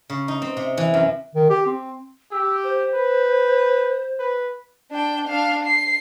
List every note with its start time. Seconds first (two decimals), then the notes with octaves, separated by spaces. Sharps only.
0.10 C#3
0.28 D#4
0.42 C4
0.57 C3
0.77 E3
0.94 F#2
1.35 D#3
1.50 G4
1.66 C4
2.32 G4 E6
2.64 C5
2.95 B4
4.19 B4
4.91 D4 G5
5.27 D4 F5
5.65 C7